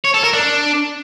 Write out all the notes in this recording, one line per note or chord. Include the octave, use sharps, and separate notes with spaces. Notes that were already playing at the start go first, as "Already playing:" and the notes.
C#5
A4
A#4
D4